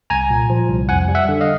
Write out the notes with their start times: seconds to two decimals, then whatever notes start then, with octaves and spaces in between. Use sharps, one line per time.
0.10 C2 G#5 A#5
0.30 A#2
0.50 F3
0.69 C2
0.89 F2 F#5 G#5
1.08 G3
1.15 E5 F#5
1.29 D3
1.41 D#5 F5